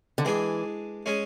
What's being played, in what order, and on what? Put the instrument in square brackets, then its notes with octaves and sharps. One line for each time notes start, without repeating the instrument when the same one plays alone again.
[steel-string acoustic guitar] D3
[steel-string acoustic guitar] E3 [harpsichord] G#3 D4 G#4
[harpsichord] G#3 C#4 G#4